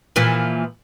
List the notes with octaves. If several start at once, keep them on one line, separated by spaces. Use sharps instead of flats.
A#2 E3 F3